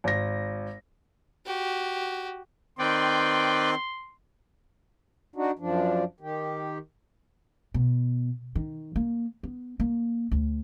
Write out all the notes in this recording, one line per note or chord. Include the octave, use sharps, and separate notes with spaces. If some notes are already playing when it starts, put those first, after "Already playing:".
G#1 A#6
F#4 G4
D#3 C4 B4 D5 G5 C6
D4 D#4 F#4
F#2 F3 D4
D#3 G4
B2
D#3
A#3
B3
A#3
D2